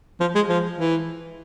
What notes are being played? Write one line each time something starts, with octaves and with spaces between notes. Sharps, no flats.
F3
G#3
F3
E3